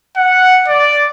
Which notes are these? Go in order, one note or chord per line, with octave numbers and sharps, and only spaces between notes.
F#5
D5